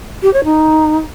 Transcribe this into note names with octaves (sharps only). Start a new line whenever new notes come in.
G4
C#5
D#4